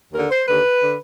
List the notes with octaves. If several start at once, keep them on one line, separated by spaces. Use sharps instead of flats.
D#2 D3 A#4
C5
D#2 D3 B4
D3